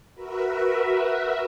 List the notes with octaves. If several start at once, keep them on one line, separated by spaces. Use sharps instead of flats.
F#4 A#4 B4 E5